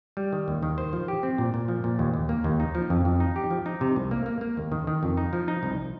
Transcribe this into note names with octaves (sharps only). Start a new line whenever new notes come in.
G3
D#3
D#2
D#3
C5
F3
G4
C4
A#2
A#2
F3
A#2
D#2
D#2
A#3
D#2
D#4
F3
F2
F2
D#4
G4
F3
D#4
C3
C2
A#3
A#3
A#3
D#2
D#3
D#3
F2
D#4
F3
D#4
C2